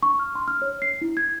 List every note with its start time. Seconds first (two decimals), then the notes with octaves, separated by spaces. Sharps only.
0.03 C#6
0.19 F6
0.35 C6
0.48 F6
0.62 C#5
0.82 C7
1.01 E4
1.17 G#6